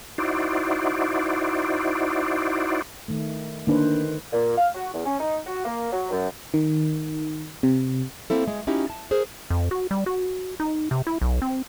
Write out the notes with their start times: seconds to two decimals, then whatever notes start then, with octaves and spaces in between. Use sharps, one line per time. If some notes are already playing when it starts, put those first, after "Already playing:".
0.18 D#4 E4 F#4 C5 D5
3.08 D#3 A3
3.67 D3 D#3 A#3 D4 B4 C5
4.33 A#2
4.58 F5
4.75 F#4
4.93 E2
5.06 C#4
5.19 D#4
5.46 F#4
5.65 A#3
5.92 F#3
6.11 F#2
6.54 D#3
7.63 C3
8.30 A#3 C4 E4 A4
8.48 G#3
8.67 C#4 D#4 E4 F#4 G4
8.90 A5
9.11 G#4 A#4 C5
9.50 F2
9.71 F#4
9.91 G3
10.06 F#4
10.60 D#4
10.91 C3
11.07 E4
11.21 B1
11.42 C4